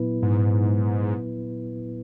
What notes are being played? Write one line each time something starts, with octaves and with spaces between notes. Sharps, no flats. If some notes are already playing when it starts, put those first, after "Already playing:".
Already playing: A#2 F#3 B3 E4 B4
G#2